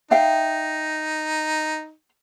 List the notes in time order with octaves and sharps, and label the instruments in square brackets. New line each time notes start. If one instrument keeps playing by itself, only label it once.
[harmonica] D#4 [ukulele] E5 F5 G5